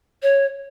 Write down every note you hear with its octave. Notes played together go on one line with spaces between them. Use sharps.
C#5